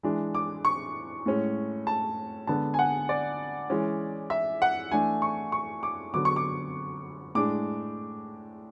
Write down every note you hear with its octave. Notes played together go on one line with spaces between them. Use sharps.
E3 G#3 D4
D6
C#6
A2 G#3 C#4
A5
D3 G#3 B3 D4 A5
G#5
F#5
D5
E3 G#3 C#4
E5
F#5
E3 A3 D4 G#5
C#6
C#6
D6
D3 F#3 B3 D6
C#6
D6
A2 G#3 D4 D6